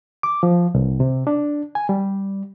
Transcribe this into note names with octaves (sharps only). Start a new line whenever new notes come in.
D6
F3
C2
C3
D4
G#5
G3